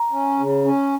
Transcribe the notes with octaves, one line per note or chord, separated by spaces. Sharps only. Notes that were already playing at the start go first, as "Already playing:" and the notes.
Already playing: A#5
C#4
C#3
C#4